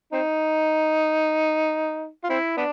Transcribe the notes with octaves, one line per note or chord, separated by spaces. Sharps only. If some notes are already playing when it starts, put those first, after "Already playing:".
C4 D#4
F4
C4 E4
B3 D4